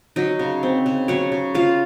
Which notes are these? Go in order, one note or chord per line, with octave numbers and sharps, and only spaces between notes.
F#3 D#4 D#5
C#3
C4
C#3
F#3 C#4 C#5
C#3
C#3 F4 F5